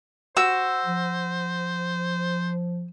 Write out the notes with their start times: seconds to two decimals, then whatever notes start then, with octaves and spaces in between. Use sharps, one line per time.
0.37 F#4 C5 E6
0.85 F3